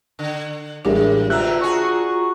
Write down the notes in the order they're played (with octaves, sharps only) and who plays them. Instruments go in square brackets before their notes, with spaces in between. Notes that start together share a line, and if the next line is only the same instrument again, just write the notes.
[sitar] D3
[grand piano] A1 G3 G#3 [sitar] A2 [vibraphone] D4 A#4 E5
[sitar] B2 D3 C4 [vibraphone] F4 A#5 [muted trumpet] E5 [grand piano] F#6
[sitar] F#4 G#4 [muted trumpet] C#6